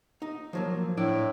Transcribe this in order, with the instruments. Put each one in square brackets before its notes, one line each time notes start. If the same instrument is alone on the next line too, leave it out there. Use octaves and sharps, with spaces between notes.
[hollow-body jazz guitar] D#4
F3 F#3 A#3
[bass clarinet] A2 [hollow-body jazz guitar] D4 E4 D5